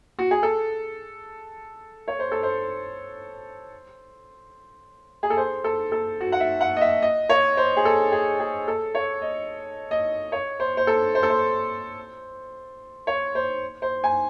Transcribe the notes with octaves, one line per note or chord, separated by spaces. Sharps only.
F#4
G#4
A4
C#5
C5
A4
C5
G#4
A4
C5
A4
A4
F#4
F#5
E5
F#5
D#5
E5
D#5
C#5
C5
G#4
A4
G#4
G#4
A4
C#5
D#5
D#5
C#5
C5
C5
A4
C5
A4
C5
C#5
C5
C5
G#5